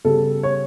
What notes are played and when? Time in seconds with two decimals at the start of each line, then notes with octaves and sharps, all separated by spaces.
0.05 C#3 G3 B3 A4
0.43 C#5